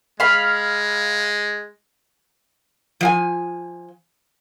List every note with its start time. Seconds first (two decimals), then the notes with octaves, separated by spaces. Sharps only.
0.20 G#3 F5 B5
3.01 F3 F5 G#5